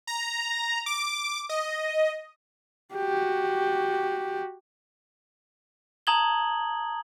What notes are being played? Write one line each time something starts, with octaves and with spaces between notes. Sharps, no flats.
A#5
D6
D#5
F#4 G4
A5 A#5 D#6 G#6 F#7 G7